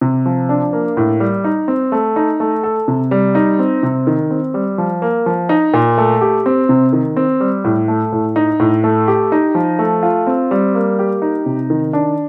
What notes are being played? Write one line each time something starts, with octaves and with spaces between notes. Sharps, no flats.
C3
F3
D4
A#3
A2
G3
D#4
C4
A3
D#4
A3
A4
C3
G3
D#4
C4
C3
D#3
C4
G3
F3
A#3
F3
D#4
A#2
A3
G4
C4
C3
D#3
C4
G3
A2
A3
A2
D#4
A2
A3
G4
D#4
F3
A3
F4
C4
G3
A#3
G4
D#4
C3
D#3
D4